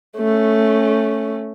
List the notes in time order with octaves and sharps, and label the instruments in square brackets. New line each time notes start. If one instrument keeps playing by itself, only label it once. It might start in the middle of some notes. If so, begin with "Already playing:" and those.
[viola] A3 C#4